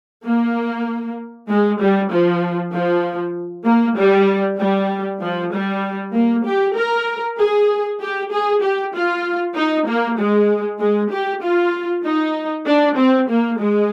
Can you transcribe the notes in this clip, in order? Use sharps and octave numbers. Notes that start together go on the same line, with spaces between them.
A#3
G#3
G3
F3
F3
A#3
G3
G3
F3
G3
A#3
G4
A#4
G#4
G4
G#4
G4
F4
D#4
A#3
G#3
G#3
G4
F4
D#4
D4
C4
A#3
G#3